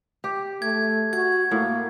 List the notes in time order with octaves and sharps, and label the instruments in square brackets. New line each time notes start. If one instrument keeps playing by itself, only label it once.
[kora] G4
[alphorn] A3 [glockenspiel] G#6
[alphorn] F#4 [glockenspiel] G#6
[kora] A2 [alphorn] A#3